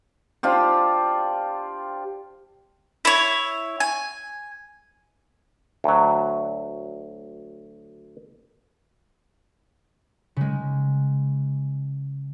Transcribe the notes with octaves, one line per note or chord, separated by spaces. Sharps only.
D4 F4 G4 C5
E4 C#5
G#5
D2 F#3
C#3 G#3